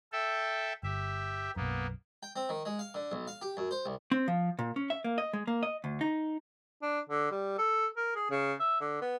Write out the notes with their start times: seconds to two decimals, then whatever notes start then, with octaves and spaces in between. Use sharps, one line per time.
0.12 A4 E5 G5
0.83 G1 G4 E5
1.56 B1 F#2 A#3 B3
2.23 G5
2.36 C4
2.49 D#3
2.65 G#3
2.79 F5
2.94 D3
3.12 B1
3.28 F5
3.42 G4
3.57 F#2
3.71 C5
3.86 C2
4.12 C4
4.28 F3
4.59 A#2
4.76 C#4
4.90 E5
5.04 A#3
5.18 D#5
5.33 G#3
5.47 A#3
5.63 D#5
5.84 D2
6.01 D#4
6.82 D4
7.09 D3
7.32 G3
7.58 A4
7.97 A#4
8.15 G#4
8.30 C#3
8.60 E5
8.80 D3
9.02 B3